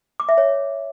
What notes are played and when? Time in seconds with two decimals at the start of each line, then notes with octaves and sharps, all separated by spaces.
0.20 D6
0.29 E5
0.38 C#5